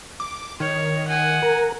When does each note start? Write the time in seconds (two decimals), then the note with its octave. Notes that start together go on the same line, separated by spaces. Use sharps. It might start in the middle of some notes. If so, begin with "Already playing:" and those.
0.20 D6
0.60 D#3 C#5
1.08 F#5 G#5
1.42 A#4